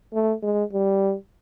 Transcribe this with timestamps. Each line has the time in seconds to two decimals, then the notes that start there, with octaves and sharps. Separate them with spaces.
0.13 A3
0.42 G#3
0.73 G3